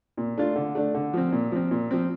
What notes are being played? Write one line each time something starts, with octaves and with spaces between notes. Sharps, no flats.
A#2
A3 D4 F4
D3
A3 D4
D3
F3 C4
A#2
F3 C4
A#2
F3 C4